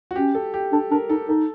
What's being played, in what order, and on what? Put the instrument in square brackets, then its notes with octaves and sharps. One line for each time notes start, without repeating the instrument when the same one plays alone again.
[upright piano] F#4
[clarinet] C#4 [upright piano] G4
[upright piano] A4
G4
[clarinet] D4 [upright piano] A4
[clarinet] D4 [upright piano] A#4
[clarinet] D#4 [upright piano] A4
[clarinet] D#4 [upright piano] A4